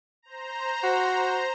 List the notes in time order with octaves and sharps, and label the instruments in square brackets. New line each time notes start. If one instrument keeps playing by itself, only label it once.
[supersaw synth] C5 A#5
[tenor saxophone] F#4